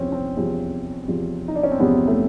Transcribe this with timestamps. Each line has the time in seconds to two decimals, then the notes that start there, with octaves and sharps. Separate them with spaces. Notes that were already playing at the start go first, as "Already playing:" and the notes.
Already playing: E2 C3 F3 C4 C#4
0.12 C4
0.37 E2 C3 F3
1.08 E2 C3 F3
1.48 D#4
1.55 D4
1.63 C#4
1.72 C4
1.80 E2 C3 F3 B3
2.07 A3